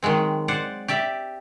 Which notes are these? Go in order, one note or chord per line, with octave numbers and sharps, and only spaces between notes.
D#3 F#3 G#3 C4
C5 D5 F#5
G4 D5 E5